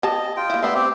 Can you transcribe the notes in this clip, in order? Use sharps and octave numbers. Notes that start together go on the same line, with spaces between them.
G4 C#5 D#5 A5
F4 G5
A#3 E4
A3 B3 D4 E5 C6
C4 G4